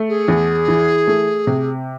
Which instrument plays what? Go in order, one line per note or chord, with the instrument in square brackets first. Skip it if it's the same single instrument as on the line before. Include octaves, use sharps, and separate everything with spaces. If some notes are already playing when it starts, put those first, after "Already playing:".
Already playing: [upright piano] A3
[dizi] G#4
[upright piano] E2
E3
A3
C3